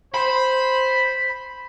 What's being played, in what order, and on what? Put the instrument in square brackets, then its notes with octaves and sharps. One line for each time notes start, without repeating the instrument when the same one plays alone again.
[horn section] C5 [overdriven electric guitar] B5